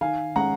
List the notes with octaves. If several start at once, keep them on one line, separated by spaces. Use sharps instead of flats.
D#3 F5 G#5
G#3 C#4 F#5 A#5